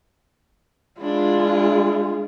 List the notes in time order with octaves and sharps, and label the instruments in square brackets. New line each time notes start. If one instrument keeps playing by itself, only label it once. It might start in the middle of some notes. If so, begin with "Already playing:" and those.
[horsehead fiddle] G#3 F4 [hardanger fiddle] D4 E4